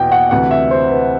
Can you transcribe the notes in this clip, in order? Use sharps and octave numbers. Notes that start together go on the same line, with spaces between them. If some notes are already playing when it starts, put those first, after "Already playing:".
Already playing: E2 B2 G5
F#5
D2 C3 E3 F#5
E5
C5
B4